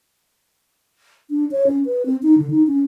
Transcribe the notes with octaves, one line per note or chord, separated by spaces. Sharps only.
D4
C#5
C#4
B4
C4
D#4
D3
D#4
C#4